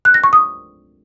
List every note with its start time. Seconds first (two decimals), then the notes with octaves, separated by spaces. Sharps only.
0.05 F#6
0.14 A#6
0.24 C#6
0.33 D#6